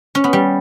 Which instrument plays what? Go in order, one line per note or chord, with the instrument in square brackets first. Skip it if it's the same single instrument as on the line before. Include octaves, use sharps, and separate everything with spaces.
[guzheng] C#4
B3
G3